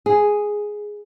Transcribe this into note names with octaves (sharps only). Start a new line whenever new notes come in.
G#4